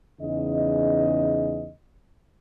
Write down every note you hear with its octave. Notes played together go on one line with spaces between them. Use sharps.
E2 C#3 D#4 D#5